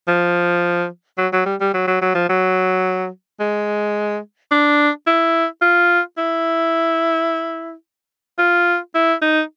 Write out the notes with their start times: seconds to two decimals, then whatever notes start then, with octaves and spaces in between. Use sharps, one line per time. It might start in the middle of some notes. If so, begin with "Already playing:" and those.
0.08 F3
1.18 F#3
1.33 F#3
1.46 G3
1.61 G3
1.74 F#3
1.87 F#3
2.02 F#3
2.15 F3
2.29 F#3
3.40 G#3
4.52 D4
5.07 E4
5.62 F4
6.18 E4
8.39 F4
8.95 E4
9.22 D#4